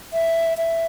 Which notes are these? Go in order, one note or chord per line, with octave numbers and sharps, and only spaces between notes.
E5
E5